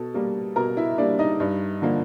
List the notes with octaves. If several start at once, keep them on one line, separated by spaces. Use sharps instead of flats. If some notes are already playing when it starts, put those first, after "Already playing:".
Already playing: B2 A4
G3 A#3
B2 A#4 A#5
E4 E5
G3 A#3 D4 D5
D#4 D#5
G2
D3 F3 A#3